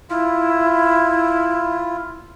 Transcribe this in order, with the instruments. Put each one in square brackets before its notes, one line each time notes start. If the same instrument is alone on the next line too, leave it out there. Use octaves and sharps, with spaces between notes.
[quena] E4 [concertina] F4